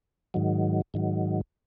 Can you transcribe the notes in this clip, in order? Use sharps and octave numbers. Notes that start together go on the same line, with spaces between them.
G#2 D#3 F#3
G#2 D#3 F#3